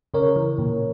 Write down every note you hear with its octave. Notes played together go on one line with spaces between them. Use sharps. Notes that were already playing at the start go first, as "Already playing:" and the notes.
C#3 A#4 C#5
E3
A#2